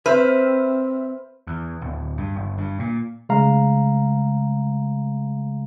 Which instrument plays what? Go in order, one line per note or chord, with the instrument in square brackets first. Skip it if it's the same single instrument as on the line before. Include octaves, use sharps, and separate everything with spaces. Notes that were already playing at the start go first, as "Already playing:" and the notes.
[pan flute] C4 [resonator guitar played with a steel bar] B4 [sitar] C5 [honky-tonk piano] E5 F6
[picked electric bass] E2
D1
G2
G1
G2
A#2
[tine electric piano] C#3 G#3 A3 F5 A#5